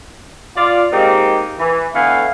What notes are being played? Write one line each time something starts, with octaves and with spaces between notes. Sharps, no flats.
F4 D5
G#3 A#3 C4 D#4 G4
E3
D3 E3 A3 B3 F5 G#5